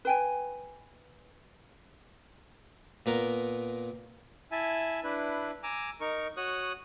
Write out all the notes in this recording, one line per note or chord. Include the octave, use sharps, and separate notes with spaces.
B4 G5 G#5
A#2 B3 A#4
E4 E5 G#5 A5
D4 E4 B4
G#5 A#5 D6 E6
D#4 A#4 C#6
F#4 C#5 D#6 F#6